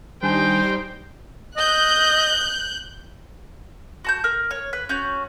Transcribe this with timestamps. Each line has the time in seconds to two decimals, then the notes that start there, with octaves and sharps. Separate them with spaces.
0.22 D#3 G3 D4 D#4 C5 G5 G#5
1.57 D#5 F#6 G6
4.05 F#4 A5 G6
4.24 A#4
4.51 C#5
4.73 B4
4.89 C#4 F#4 G6